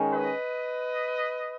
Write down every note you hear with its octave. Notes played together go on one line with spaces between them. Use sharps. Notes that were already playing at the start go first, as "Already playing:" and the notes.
Already playing: D#3 G#3 C#4
B4 D#5